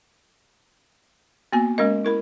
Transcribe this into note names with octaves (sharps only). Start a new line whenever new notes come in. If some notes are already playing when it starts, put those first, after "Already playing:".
A#3 B3 F#4 G#5
G#3 C#4 A#4 D#5
E4 A#4 B5